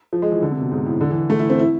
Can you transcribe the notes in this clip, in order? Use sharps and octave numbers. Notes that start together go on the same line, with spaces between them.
F3
G#3
E3
D3
C3
B2
G#2
A2
D3
E3
A3
E4
C4
E4